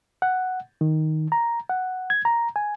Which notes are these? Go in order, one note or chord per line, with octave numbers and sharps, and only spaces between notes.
F#5
D#3
A#5
F#5
G#6
A#5
G#5